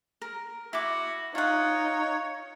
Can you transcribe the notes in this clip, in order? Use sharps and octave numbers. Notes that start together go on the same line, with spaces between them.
A#4
E4 F#4 D6
D#4 F4 C#5 F#5